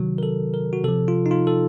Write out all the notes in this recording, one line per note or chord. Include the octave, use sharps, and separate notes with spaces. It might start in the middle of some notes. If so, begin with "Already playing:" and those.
Already playing: C3 D#3 F#3 F#4
A#4
A4
A#4
F#4
C3 F3 A4
F4
D#4
F4
A4